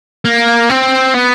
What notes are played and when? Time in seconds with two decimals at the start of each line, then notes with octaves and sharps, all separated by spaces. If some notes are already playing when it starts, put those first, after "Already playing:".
0.25 A#3
0.70 C4
1.14 B3